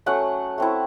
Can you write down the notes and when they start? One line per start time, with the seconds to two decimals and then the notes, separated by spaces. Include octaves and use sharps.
0.06 F#3 A3 C#4 F#5
0.58 A3 C4 E4